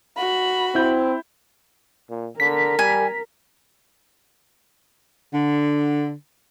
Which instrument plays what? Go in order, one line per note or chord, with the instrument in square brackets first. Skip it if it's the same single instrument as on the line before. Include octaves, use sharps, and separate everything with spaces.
[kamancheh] F#4 B5
[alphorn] C4 [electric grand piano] E4 G6
[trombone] A#2
[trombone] D3 [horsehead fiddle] A#4 [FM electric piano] B6
[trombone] G3 [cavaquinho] G#5
[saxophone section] D3